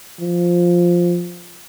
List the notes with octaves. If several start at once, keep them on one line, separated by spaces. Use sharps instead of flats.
F3